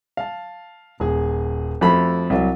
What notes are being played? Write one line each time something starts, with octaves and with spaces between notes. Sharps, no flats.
F5 A5
D#1 G#4
F2 A3 F4 F#4 A4 B5
C2 F#3